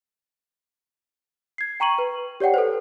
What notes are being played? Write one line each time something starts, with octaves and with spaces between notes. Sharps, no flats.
G#6 C7
G5 A#5 C#6 D#7 F#7
B4
G4 C#5 D5 F#5 G5
A4 B4 C5